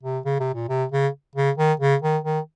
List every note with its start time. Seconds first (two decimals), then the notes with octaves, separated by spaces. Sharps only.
0.03 C3
0.25 C#3
0.40 C3
0.55 A#2
0.69 C3
0.92 C#3
1.35 C#3
1.57 D#3
1.80 C#3
2.02 D#3
2.24 D#3